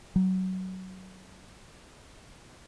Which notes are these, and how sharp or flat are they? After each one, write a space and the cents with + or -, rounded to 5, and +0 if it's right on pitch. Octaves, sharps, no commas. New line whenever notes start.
F#3 +20